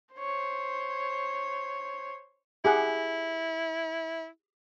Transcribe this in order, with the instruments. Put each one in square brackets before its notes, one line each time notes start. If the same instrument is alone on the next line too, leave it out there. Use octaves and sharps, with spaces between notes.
[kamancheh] C5 C#5
[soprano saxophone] E4 [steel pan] G4 G#4 F#5